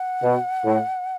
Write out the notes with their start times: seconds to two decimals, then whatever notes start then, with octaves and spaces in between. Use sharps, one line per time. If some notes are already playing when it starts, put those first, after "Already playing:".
Already playing: F#5
0.22 B2
0.64 A2